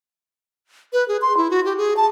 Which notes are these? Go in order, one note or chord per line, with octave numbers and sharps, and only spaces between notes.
B4
G#4
C6
E4
F#4
G4
G#4
A5